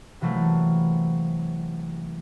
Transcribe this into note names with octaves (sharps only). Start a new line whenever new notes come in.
C3 E3 F#3 A3 A#3